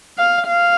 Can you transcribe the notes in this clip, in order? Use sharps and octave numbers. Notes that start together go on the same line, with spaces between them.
F5
F5